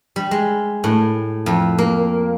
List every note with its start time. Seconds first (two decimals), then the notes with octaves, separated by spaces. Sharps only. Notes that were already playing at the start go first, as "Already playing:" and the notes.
0.16 G3
0.31 G#3
0.84 A2
1.46 F2
1.78 A#3